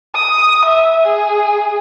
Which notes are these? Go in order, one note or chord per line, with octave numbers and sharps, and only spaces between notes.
D#6
E5
G#4